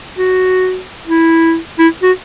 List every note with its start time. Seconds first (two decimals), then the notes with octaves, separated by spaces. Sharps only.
0.18 F#4
1.07 E4
1.79 E4
2.03 F#4